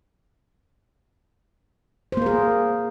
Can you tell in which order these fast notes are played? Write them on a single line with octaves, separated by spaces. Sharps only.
C5 A#3 A#4 G#4